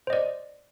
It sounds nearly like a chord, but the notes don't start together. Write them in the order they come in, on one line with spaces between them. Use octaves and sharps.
C5 D#5 D5